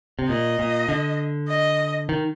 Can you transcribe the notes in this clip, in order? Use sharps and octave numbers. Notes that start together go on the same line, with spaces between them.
C3
A#2 D#5
A#2
D3
D#5
D#3